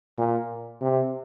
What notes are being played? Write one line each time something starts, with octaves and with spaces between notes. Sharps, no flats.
A#2
C3